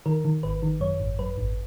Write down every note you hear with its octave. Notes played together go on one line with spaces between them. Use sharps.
D#3 A#4
D#3
G#1 B4
D#3
F#2 C#5
G#1
F#2 B4
G#1